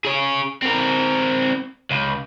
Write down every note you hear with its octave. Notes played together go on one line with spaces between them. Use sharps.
G#4 C#5
C4 A#4
C#2